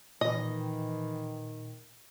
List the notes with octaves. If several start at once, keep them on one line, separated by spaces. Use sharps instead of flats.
A#2 D#3 E3 D#5